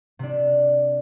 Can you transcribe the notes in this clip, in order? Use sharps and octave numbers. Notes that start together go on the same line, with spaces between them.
C3 D4